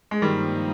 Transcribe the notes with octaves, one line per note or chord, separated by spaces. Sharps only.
G#3
G2 D#3 F3 G3 A#3 D#4